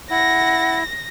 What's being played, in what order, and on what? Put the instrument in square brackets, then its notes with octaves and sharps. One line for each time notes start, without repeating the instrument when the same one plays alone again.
[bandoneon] E4 [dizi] F#5 [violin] A#6